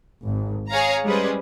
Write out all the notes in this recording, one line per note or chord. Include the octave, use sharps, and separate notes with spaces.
G#1
G#4 C#5 F5 A#5
G3 G#3 C#4 G#4 B4 C5